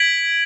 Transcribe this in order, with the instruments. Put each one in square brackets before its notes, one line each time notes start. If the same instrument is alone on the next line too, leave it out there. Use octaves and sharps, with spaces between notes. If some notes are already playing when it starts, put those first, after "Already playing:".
Already playing: [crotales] G#6 B6 D7 F#7